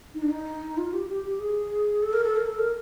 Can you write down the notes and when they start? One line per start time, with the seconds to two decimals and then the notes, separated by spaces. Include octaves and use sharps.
0.15 D#4
0.22 D4
0.30 D#4
0.78 F4
0.93 G4
1.09 G4
1.24 G4
1.40 G#4
2.03 A4
2.13 A#4
2.24 A4
2.36 A#4
2.47 A4
2.59 A#4